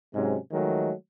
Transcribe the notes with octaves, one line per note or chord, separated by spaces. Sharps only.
G#2 C3 F#3 G#3 C#4
D#3 F3 F#3 G#3 A3